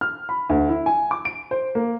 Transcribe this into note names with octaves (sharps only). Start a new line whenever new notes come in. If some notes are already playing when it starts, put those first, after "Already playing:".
F6
B5
D2
E4
G#5
D6
D7
C5
A#3